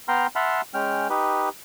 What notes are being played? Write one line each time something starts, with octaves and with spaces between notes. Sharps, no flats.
B3 G5 A#5 C6 F6
E5 F#5 A5 B5 C6 F6
G#3 C#4 G5 F6
D#4 G4 B4